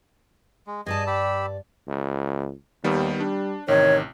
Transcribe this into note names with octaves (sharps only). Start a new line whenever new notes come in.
G#3
G2 G#4 D5 D#5 G#5 A5
G4 B5 E6
C#2
D#2 D#3 G3 B3
G3 D4
A1 C3 D#3 C#5